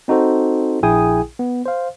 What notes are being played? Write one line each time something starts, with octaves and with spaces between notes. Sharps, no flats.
C4 D#4 F#4 A4 C5
A#1 E4 G#4 G5 G#5 D#6
B3
C5 F5